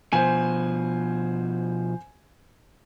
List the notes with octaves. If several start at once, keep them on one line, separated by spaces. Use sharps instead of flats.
B2 F3 C5 G#5